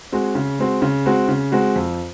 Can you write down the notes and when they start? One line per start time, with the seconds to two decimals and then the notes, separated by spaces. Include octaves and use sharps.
0.12 G#3 C4 F#4
0.35 C#3
0.59 G#3 C4 F#4
0.82 C#3
1.06 G#3 C4 F#4
1.28 C#3
1.52 G#3 C4 F#4
1.76 F2